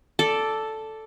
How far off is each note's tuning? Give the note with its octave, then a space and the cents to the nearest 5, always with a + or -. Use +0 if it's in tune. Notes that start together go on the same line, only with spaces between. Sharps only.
A4 +0 D5 -5